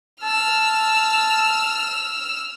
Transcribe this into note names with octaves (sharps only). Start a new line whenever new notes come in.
A5 E6 F6